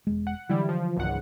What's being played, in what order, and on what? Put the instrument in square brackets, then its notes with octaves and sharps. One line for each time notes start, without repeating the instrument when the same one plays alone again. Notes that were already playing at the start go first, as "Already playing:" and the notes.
[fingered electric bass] E1 G#3
[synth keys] F#5
[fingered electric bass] D3 E3 F#3 [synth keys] G3 E4
[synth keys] F3
G#1 C#2 F#5